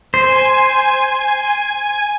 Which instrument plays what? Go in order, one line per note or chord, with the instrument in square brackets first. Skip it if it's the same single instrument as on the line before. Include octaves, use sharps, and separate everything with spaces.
[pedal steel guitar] C5 [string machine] G#5